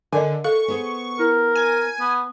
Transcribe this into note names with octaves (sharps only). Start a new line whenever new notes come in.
D3 A#4 D5 D#5 G#5
A4 F5 C#6
B3 G#4 C5
E4 A#4
G#5
B3